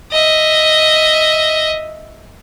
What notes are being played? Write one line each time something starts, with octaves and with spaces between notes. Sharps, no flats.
D#5 E5